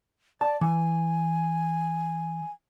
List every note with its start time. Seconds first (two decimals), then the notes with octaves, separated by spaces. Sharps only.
0.41 D5 A5
0.61 E3 G#5